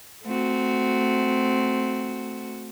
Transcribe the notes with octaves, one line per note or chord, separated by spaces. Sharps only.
A3 C4 F#4